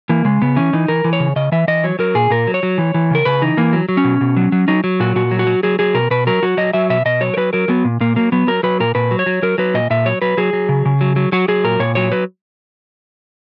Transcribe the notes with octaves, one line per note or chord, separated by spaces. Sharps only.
E3 A#3
C#3 G#3
C#3 B3
E3 C#4
E3 D#4
E3 A#4
E3
C#5
C#3
C#3 D#5
E3 E5
E3 D#5
F#3 C#5
F#3 A#4
A#2 G#4
A#2 A#4
F#3
C#5
F#3
E3
E3
C#3 A#4
C#3 B4
E3 D#4
E3 A#3
F#3
F#3
C#4
B2
B2
F#3
F#3
F#3 D#4
F#3
A#2 F#4
A#2 F#4
F#3
F#4
F#3
F#3 G#4
F#3 G#4
B2 A#4
B2 B4
F#3 A#4
F#3 F#4
F#3 D#5
F#3 E5
B2 E5
B2 D#5
F#3 C#5
A#4
F#3 B4
F#3 A#4
F#3 B3
A#2
A#2 A#3
F#3 A#3
F#3 B3
F#3 A#4
F#3 B4
A#2 A#4
A#2 B4
F#3
C#5
F#3
F#3 A#4
F#3 B4
A#2 D#5
A#2 E5
F#3 C#5
F#3 B4
F#3 G#4
F#3
C#3
C#3
F#3
F#3
F#3 F#4
F#3 G#4
A#2 A#4
A#2 C#5
F#3 C#5
F#3 B4